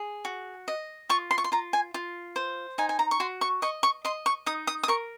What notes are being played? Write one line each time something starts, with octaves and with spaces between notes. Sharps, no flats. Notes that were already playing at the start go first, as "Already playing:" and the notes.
Already playing: G#4
F#4
D#5
F4 C#6
C6
C#6
C6
F4 A#5
G#5
F4
C5
D#4 G#5
G#5
A#5
C#6
F#4 C6
C#6
D#5 C#6
C#6
D#5 C6
C#6
D#4 D#6
D#6
D#6
A#4 C#6